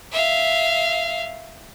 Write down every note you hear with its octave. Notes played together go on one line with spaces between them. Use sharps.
E5 F5